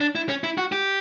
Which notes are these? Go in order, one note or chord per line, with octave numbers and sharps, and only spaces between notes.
D4
E4
C#4
E4
F#4
G4